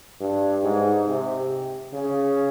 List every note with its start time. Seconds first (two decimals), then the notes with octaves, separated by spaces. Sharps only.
0.20 G2
0.63 G#2
1.07 C3
1.93 C#3